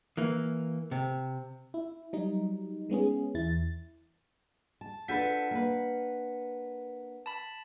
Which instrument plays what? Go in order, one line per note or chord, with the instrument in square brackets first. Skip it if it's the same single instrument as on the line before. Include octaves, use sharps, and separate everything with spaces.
[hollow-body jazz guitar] E3 A#3
C3
[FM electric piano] E4
F#3 G3 D#4
G#3 B3 C#4 G#4
E2 E4 A6
[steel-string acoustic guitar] A5
[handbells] D4 F#5 B6 [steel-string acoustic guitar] F4 A4 B4
[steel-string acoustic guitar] A#3 B4
[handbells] A5 B5